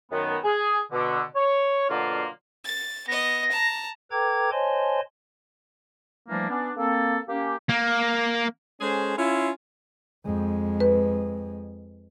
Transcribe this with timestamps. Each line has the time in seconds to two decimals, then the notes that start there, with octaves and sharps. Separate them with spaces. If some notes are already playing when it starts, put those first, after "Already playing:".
0.11 F#2 D#3 B3
0.44 G#4
0.92 B2 D3
1.35 C#5
1.89 B2 D3 F#3 A#3 D4 F4
2.65 A6
3.08 B3 D#5 A#6
3.52 A5 A#5
4.11 A4 B4 G5 A#5 D6 G#6
4.52 C5 C#5 D#5 G#5 A5 C6
6.28 E3 F3 G3 A3 A#3 D4
6.49 B3 C#4 D4
6.77 A#3 C4 A4
7.28 A#3 C#4 G4
7.69 A#3
8.81 G#3 C#4 G#4 A4 C5
9.18 C#4 E4 F4
10.25 F2 G#3
10.80 B4